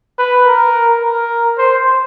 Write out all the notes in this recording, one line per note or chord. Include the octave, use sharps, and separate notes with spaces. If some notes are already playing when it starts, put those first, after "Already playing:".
B4
A#4
A#4
C5